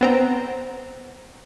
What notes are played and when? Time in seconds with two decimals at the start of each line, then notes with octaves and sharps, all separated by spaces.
0.01 B3 C4 A#5